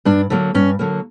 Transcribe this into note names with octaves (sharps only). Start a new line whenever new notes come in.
G2 D4
D3 F#3 A#3
G2 C#4
D3 F#3 A#3